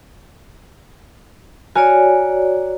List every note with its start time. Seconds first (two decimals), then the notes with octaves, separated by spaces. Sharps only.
1.76 F#4 C#5 D5 G#5 A#5 F6